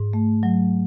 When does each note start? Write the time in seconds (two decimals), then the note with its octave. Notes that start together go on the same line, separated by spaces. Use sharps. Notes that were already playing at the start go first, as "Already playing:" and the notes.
Already playing: G#2
0.13 A3
0.43 F#3